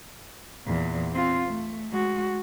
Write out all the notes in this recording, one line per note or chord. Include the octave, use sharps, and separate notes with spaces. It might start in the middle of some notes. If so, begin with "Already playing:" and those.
E2 A#2
C4 F4
A3
G#3 F#4